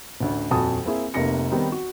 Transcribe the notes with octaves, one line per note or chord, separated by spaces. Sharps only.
A1 D2
D#1 F2 F#4 G#5 A5 D#6
A#3 C4 E4 G#4
F1 C3 A#3 A#6 C#7
D#3 G3 B3 C4 D#4
F#4